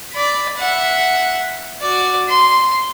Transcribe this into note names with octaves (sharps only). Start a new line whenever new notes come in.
D5 B5
E5 F#5
F#4 D5
C6